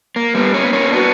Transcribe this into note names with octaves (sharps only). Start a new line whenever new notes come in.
A#3
G3 B3
A#3 C#4
B3
A#3 C#4
B3 D4 F#4